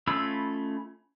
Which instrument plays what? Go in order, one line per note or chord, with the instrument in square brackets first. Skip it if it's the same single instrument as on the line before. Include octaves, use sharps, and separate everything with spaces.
[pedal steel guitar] A3 C#4 F4 B5 E6